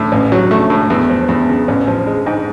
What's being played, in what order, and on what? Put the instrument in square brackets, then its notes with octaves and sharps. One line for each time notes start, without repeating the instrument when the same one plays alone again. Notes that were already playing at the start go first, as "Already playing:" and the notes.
Already playing: [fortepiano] A2
A1
F#3
A3
A2
E2
F3
E2
C#3
A1
F3
G#3
G#2